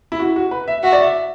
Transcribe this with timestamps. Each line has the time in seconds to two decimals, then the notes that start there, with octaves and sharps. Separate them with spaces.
0.12 E4
0.19 F#4
0.36 F#4
0.51 B4
0.68 E5
0.83 F#4 E5
0.93 D5
1.02 E5